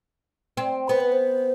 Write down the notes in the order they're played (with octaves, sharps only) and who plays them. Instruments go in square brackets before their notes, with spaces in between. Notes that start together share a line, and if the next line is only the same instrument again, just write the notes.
[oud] C4
[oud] B3 [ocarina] C5
[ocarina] B4
C5